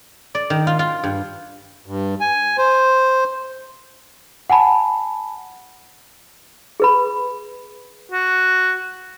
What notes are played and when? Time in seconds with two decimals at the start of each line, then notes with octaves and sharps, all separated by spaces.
0.35 D5
0.50 D#3
0.67 F4
0.79 F4
1.04 G2
1.86 G2
2.21 G#5
2.58 C5
4.49 F#5 G#5 A5 B5
6.80 G#4 B4 B5
8.11 F#4